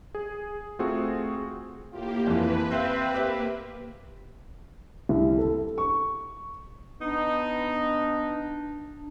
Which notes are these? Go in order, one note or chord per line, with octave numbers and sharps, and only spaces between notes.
G#4
A3 C4 F4 F#4 G#4
A2 A#3 F4 G4
F2 E3 B4
C4 E5 F5
A#3 G4 B4 E5
C2
A4
C#6
B3 D4 D#4